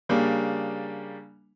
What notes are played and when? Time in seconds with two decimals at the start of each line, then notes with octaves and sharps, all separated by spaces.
0.09 C#3 G3 A#3 D4